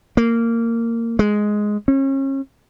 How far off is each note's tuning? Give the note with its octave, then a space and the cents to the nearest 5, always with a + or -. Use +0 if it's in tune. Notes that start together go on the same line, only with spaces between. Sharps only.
A#3 -15
G#3 +5
C#4 -35